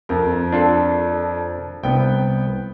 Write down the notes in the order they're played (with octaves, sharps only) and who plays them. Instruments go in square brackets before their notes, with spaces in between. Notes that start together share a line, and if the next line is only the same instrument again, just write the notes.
[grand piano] F2 A#4
[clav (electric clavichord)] D4 F4 A4
[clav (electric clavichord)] C2 [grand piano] B3 G5